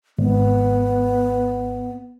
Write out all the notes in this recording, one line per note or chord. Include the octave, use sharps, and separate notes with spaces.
G#1 B3